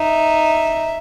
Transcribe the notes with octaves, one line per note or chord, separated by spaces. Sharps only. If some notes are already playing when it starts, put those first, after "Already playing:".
Already playing: D#4 E5